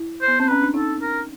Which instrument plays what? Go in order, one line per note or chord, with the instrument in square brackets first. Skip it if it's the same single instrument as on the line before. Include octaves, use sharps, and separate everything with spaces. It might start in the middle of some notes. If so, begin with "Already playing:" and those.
Already playing: [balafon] E4
[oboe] C5
[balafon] B3
[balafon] C4 [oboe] C5
[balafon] C#4 [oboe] B4
[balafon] D4
[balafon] D#4 [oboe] A4
[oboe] A#4